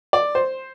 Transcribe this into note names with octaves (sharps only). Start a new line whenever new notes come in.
D5
C5